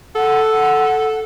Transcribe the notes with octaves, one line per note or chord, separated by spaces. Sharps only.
A4 F#5